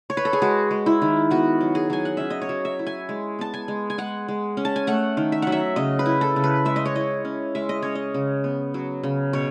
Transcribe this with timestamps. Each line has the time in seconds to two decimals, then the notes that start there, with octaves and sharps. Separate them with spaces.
0.10 C#5
0.17 B4
0.25 A4
0.33 G#4
0.42 G#3 F#4
0.71 G#3
0.86 E4
1.02 D#3
1.31 B3 F#4
1.61 F#3
1.75 G#4
1.90 F#3 G#5
2.05 F#5
2.17 C#4 E5
2.30 D#5
2.42 C#5
2.49 F#3
2.65 E5
2.79 E4
2.87 G#5
3.09 G#3
3.39 B3 A5
3.54 G#5
3.68 G#3
3.90 G#5
3.98 G#3 F#5
4.28 G#3
4.57 C#4
4.65 A5
4.76 G#5
4.87 A3 F#5
5.17 D#3
5.32 E5
5.42 F#3 F#5
5.52 E5
5.76 C#3 D#5
5.99 B4
6.06 E4
6.21 A4
6.36 C#3
6.44 B4
6.65 G#3 E5
6.76 D#5
6.85 C#5
6.96 E4 D#5
7.25 C#4
7.55 G#3 E5
7.69 D#5
7.82 C#4 C#5
7.95 D#5
8.14 C#3
8.44 B3
8.74 F#3
9.03 C#3
9.33 B2 C#5